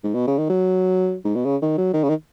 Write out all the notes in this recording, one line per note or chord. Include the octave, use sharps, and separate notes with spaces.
G#2
B2
C#3
D#3
F#3
G#2
B2
C#3
D#3
F#3
D#3
C#3
D#3